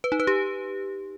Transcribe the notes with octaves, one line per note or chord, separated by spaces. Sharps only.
B4
D#4
B4
G4